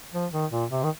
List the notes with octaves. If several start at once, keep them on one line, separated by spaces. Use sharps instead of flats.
F3
D#3
A#2
C3
D#3